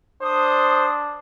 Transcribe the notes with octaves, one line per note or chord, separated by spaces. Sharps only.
D4 C5 D#6